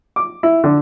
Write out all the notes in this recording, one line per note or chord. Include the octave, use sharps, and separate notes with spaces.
D6
E4
D3